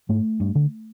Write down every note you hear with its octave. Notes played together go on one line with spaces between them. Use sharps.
G#2 A3
G2
D3